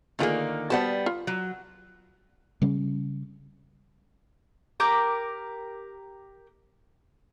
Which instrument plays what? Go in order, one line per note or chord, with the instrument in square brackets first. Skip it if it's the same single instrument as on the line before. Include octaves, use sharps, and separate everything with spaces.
[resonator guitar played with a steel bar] D3 D#3 A#3 [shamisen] A3 F4 G#4
[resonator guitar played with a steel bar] G3 B3 A5 [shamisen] F#4 C5 F#5
[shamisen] F4
[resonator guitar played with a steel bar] F#3
[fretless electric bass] C#3 G3 C#4
[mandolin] G4 A#4 D6